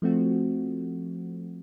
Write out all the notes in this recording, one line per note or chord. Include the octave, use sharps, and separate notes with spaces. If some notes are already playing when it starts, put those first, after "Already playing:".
F3 A3 C4 F#4